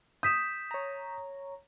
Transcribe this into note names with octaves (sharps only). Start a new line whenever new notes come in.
D#6 G6 B6 E7
C#5 A#5